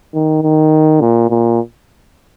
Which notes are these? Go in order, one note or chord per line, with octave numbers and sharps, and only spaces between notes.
D#3
D#3
A#2
A#2